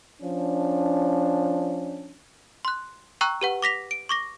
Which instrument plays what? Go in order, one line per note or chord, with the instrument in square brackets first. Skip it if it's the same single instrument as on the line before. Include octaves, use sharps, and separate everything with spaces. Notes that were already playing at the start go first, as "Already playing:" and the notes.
[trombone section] F3 C#4 D4
[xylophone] C6 F#6
G5 A#5 C#6 E6 F#6
G4 B4 F#5
D6 A#6 B6 F7
D7
C#6 D6 A#6